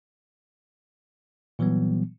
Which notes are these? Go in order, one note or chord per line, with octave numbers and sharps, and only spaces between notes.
A#2 E3 F#3 G3 B3